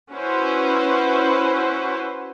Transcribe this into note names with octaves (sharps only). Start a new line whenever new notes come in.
C#4 E4 F#4 B4 C5